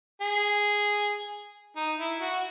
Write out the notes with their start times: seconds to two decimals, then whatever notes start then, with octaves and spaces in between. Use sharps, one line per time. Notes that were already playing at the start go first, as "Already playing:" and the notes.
0.21 G#4
1.76 D#4
1.98 E4
2.21 F#4